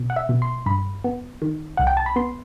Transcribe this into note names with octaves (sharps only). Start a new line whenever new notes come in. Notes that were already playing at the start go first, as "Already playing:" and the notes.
Already playing: B2
F#5
E5
B2
C6
G2 B5
B3
D#3
C2 F#5
G5
A5
B5
B3 C6